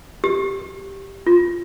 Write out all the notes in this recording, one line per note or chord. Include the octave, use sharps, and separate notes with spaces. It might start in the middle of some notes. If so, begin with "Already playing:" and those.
G4
F4